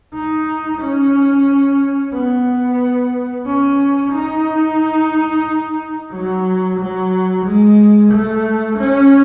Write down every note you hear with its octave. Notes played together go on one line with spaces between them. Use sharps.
D#4
C#4
B3
C#4
D#4
F#3
F#3
G#3
A3
C#4